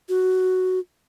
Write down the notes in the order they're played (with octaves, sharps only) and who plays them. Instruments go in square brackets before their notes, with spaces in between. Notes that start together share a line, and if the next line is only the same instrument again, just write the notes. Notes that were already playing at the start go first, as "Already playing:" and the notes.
[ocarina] F#4